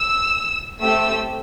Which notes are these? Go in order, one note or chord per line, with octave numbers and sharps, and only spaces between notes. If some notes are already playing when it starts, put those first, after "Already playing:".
Already playing: E6
A3 C4 G4 E6